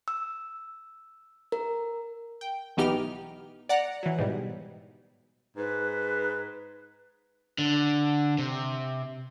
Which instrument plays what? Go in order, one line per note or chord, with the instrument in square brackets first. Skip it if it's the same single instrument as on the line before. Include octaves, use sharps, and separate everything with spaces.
[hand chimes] E6
A#4
[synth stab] G5
B1 E3 B3 D#4 G4 F6
D5 F#5 A#5
E3 F#3
G#2 B2 G3
[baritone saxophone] G#2 [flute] B4
[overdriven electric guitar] D3
C3